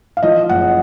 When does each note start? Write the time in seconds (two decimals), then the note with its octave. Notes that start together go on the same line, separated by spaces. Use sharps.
0.17 F5
0.23 F3 D#5
0.49 F#1 F#5